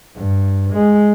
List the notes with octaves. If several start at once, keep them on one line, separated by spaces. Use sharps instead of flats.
G2
G#3